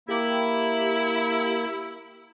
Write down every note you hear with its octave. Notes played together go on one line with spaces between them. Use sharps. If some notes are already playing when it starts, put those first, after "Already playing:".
A#3 E4 G4